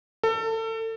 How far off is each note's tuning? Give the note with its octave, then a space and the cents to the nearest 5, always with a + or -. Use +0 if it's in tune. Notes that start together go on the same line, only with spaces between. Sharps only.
A4 +30